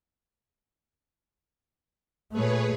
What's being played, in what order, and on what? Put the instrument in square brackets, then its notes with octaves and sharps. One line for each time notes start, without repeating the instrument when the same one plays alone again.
[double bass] A#2 A3 [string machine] G#4 B4 C#5